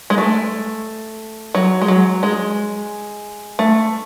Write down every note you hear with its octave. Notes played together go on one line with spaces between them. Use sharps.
G#3
A3
F#3
G#3
F#3
G#3
A3